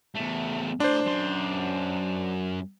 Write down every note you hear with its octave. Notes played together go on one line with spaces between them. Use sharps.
E2 A3
A2 D4 C5 C6
F#2 C6